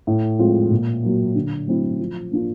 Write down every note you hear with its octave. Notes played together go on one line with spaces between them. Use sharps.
A2
F3 G#3 C4 F4
A#2
F#3 A#3
D3
F#3 A3 C4 E4
F3
A#3 D4 F4